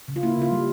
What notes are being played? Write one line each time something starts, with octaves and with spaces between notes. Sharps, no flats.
C#3
F4
A#3 E4
C#3 F4
G3